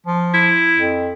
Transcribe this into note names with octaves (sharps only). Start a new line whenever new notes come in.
F3
E4
F2